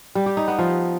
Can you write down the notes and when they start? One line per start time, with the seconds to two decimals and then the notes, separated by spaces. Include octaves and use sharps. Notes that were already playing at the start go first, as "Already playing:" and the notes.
0.15 G3
0.26 G4
0.37 D#4
0.48 B3
0.59 F3